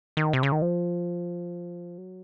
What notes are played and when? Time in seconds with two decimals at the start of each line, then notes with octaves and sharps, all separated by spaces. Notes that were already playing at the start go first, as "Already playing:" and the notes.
0.17 D#3
0.33 C3
0.43 C#3
0.52 D#3
0.62 F3
1.98 F#3